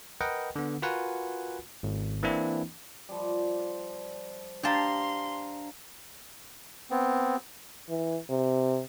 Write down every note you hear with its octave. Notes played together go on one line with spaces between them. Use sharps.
A#4 B4 D#5 F#5 G5
D3 B3
F4 F#4 A#4 B4 F#5 G#5
G#1
E3 A#3 C4 D4 E4
F3 G3
D4 G4 F5 A5 A#5 C6
B3 C4
E3
C3